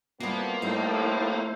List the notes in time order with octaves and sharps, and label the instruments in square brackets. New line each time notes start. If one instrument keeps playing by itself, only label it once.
[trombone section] F2 B3 [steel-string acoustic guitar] G3 E4 F#4 [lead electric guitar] A#3
[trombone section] F2 A2 [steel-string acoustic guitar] G3 D#4 [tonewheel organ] A3 E4 C5